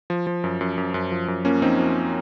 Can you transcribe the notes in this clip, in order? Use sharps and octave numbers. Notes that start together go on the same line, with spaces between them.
F3
F3
F#2
F#2
F#2
F#2
F3
F#2
F3 A#3 C#4
F3 C4 D#4
F3